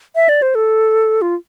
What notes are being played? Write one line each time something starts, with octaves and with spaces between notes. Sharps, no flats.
E5
D5
C5
A4
F4